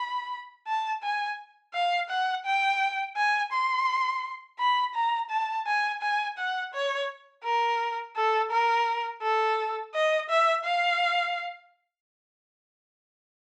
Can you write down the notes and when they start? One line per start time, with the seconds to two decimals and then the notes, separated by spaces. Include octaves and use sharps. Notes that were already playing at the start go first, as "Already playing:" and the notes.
Already playing: B5
0.67 A5
1.03 G#5
1.74 F5
2.10 F#5
2.45 G5
3.16 G#5
3.52 C6
4.59 B5
4.95 A#5
5.30 A5
5.67 G#5
6.02 G#5
6.38 F#5
6.74 C#5
7.44 A#4
8.16 A4
8.51 A#4
9.22 A4
9.95 D#5
10.30 E5
10.65 F5